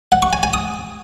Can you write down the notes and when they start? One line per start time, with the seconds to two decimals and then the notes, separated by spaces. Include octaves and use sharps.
0.12 F#5
0.22 C#6
0.33 G#5
0.43 G#5
0.54 D#6